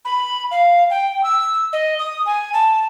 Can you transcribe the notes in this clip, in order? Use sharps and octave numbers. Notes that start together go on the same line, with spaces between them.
B5
F5
G5
E6
D#5
D#6
G#5
A5